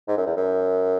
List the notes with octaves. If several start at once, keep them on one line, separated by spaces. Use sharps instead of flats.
G#2
F#2
E2
F#2